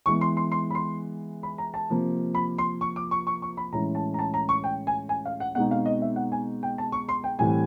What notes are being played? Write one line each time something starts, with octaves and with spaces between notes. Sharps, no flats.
E3 G#3 B3 C#6
C6
C6
C6
B5
C6
B5
A#5
A5
C3 F3 A#3
B5
C6
C#6
D6
C#6
C#6
C#6
B5
A2 E3 G#3 C#4 E4 A#5
A5
A#5
A5
A#5
C#6
G5
G#5
G#5
F5
F#5
B2 G#3 C4 D#4 F#5
F5
D#5
E5
F#5
G#5
G5
A5
C#6
C6
G5
A2 E3 G3 C4 G#5